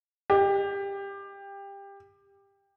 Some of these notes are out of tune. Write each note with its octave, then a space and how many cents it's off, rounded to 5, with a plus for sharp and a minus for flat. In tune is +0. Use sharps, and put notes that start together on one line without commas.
G4 +20